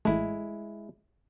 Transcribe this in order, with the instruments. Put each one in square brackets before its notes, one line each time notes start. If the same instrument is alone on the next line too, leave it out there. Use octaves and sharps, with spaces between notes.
[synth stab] A1 E3 A3 [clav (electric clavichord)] G#3 E4